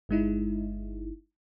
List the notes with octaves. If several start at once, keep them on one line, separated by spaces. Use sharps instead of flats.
G1 G#3 D#4 E4